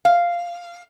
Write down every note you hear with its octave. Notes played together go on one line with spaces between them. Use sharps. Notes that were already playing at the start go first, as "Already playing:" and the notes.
F5